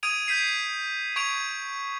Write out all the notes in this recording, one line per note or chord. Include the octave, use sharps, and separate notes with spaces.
D#6 G#6 D7 D#7 F7
G6 G#6 B6 C7 D7 D#7
C#6 G#6 D7 F7